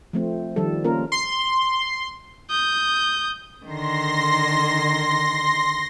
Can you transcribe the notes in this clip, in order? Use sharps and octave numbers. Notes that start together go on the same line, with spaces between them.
F3 A3 C4
D#3 F3 G3 A4
A#3 C#4 F4 A#4
C6
D#6 G6
D3 D#3 C6 A#6